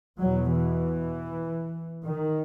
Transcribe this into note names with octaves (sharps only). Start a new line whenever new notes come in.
E2 B2 F#3
E3
D#3